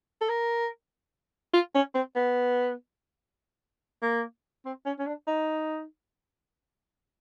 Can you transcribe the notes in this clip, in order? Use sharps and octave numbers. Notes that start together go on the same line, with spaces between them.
A4
A#4
F4
C#4
C4
B3
A#3
C4
C#4
C#4
D4
D#4